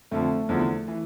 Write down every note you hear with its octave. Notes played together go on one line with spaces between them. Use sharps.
F2 D3 F3 A3
E2 D3 F3
E3